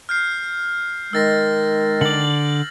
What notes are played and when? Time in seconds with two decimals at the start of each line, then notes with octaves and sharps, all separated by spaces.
0.09 F6 G6 C7
1.13 D#3 G#3 E6 A6 A#6
2.01 D3 D5 F#7